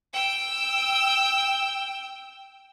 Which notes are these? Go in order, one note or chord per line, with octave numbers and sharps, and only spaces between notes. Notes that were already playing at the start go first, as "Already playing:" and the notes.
G5 E6